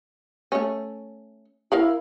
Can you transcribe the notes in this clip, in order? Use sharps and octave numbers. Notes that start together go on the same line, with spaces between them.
A3 C#4
E4 A#4 F5 B5